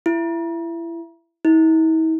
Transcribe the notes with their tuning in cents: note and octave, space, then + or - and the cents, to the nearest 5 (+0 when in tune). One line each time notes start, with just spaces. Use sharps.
E4 +25
E4 -45